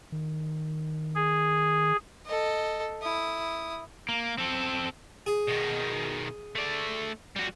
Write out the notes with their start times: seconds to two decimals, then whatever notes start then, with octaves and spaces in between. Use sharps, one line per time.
0.12 D#3
1.15 G#4
2.26 A4 D#5
3.02 E4 D#6
4.09 A#3
4.38 C4 A4
5.26 G#4
5.48 B2 D#3
6.56 A3 D5
7.36 G3 F#4